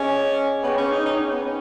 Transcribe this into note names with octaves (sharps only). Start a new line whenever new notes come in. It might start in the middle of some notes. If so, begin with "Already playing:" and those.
Already playing: C#4 G#4 D#5 G#5
B3 G#4 C#5 G5
C#4
D#4
D#4
C#4
B3
C#4